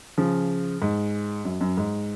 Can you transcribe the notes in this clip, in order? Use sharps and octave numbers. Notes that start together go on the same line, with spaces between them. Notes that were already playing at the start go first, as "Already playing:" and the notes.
C#3 F3
G#2
F#2
F#2
G#2